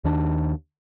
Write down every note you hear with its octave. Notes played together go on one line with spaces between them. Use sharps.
D#2 D#3 D4